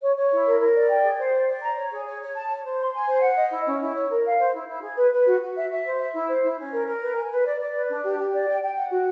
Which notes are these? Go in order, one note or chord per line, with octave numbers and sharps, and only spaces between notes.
C#5
C#5
E4
A#4
A#4
D5
G5
G#4
C5
D5
D5
A#5
C#5
G#4
C#5
C#5
A5
C#5
C5
C6
G#5
C5
F#5
D#5
E4
C#4
E4
C#5
A#4
F5
C5
E4
E4
G#4
B4
B4
F#4
F#4
E5
E5
C5
E5
E4
C5
E4
C#4
A#4
A#4
B4
G#5
B4
D5
D5
B4
D4
G4
G4
D5
G5
G5
F#5
F#4